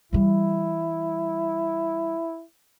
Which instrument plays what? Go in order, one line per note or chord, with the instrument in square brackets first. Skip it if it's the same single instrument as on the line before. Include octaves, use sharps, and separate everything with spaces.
[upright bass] E3 G3 [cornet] E4